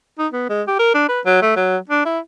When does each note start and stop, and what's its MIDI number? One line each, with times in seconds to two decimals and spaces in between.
0.18 0.28 63
0.33 0.48 59
0.49 0.62 56
0.67 0.77 67
0.79 0.93 70
0.94 1.07 62
1.09 1.20 71
1.26 1.41 54
1.42 1.55 57
1.56 1.77 54
1.89 2.04 62
2.05 2.19 64